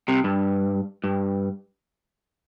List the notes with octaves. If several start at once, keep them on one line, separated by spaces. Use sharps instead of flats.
C2 C3
G2
G2